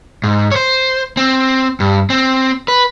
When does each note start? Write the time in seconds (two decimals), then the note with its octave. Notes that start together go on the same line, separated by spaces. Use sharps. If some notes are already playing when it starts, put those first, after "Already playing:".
0.24 G#2
0.51 C5 C#5
1.17 C4
1.80 G2
2.10 C4
2.68 B4